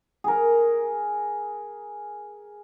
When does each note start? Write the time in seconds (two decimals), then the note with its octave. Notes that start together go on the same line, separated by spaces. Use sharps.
0.24 G#4 A#4